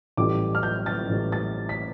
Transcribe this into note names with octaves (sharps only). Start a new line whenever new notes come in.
A1 A2 E3 G3 D6
F6
G6
A6
A1 A2 E3 G3
A6
B6